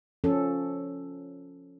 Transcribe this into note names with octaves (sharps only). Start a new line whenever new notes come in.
F3 C#4 A4